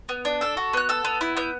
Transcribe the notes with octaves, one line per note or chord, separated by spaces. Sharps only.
B3
D4
A4 E6
F#4
B3 F#6
A4 E6
B3
E4
B3 G6